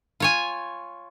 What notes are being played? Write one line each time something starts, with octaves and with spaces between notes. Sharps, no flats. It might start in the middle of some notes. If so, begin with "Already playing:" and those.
F4 C#5 G#5